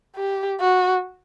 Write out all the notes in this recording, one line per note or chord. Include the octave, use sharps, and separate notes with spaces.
G4
F#4